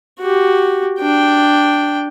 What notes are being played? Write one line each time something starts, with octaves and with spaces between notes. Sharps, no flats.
F#4 G4
D4 G5